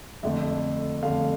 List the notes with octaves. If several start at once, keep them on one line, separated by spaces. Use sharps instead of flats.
F2 D3 A3 E5
F2 D3 A3 F5